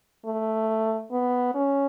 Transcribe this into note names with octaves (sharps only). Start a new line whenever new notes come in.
A3
B3
C#4